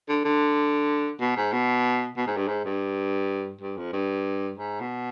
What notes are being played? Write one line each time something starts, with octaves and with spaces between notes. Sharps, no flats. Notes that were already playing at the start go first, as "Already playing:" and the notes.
D3
D3
B2
G#2
B2
B2
G#2
G2
G#2
G2
G2
F2
G2
G#2
B2